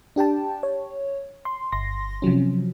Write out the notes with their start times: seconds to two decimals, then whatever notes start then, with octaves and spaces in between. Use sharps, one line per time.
0.16 D4 G4 G5 A5
0.63 C#5
1.45 C6
1.72 G1 C6 A#6
2.22 C3 F3 F#3 C#4